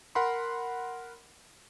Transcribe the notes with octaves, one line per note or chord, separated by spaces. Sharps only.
A#4 F#5 B5 C6